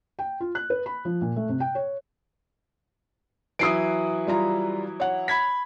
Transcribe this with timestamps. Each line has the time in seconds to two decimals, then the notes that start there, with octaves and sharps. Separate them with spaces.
0.19 G5
0.40 F4
0.55 F#6
0.70 B4
0.86 B5
1.05 F3
1.22 A#2
1.36 A3
1.49 C3
1.60 G5
1.75 C#5
3.59 E3 F#3 E4 D#6 C7 D7
4.27 G3 F4 A#5
5.00 C#5 F#5
5.28 B5 G#6 B6